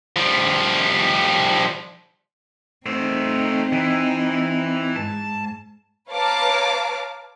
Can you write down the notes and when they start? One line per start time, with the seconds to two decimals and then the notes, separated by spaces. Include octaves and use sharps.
0.16 F3 G3
2.86 A3 C4 D#4 C5
3.72 E3
4.96 G#2 A5
6.10 B4 C#5 F5 A5 A#5 D6